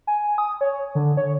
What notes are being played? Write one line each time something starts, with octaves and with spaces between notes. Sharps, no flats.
G#5
D#6
C#5
D3
C#5